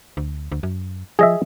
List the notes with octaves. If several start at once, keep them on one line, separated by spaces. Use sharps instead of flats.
D2
D2
F#2
F3 G#4 D#5 E5